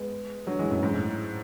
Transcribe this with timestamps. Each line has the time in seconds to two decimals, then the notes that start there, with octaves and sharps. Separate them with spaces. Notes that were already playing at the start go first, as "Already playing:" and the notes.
Already playing: G#3 B3
0.47 D3 F#3
0.59 E3 G#3
0.71 F#2 A2
0.83 G#2
0.94 A2